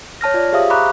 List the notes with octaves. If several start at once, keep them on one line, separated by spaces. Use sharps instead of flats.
C#5 A5 F6 A#6
F4 D5
G4 G#4 C5 E5 F5 D#6
A#5 B5 C#6 D6 F#6